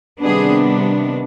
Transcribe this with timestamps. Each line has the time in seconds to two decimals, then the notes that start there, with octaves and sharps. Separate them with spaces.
0.22 C3 D#3 G3 B3 D4 G#4